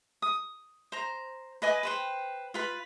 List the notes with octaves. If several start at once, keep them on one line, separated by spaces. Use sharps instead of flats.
D#6
C5 A#5
B4 D#5 G#5 D6
B4 C5 G5
F4 B4 B5